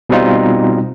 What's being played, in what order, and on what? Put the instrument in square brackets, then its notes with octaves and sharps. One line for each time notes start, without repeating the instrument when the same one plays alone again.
[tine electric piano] B2 G3 C4 D#4 F4